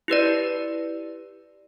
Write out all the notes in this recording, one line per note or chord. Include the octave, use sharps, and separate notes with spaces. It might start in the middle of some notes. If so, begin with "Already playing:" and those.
E4 G4 B4 D5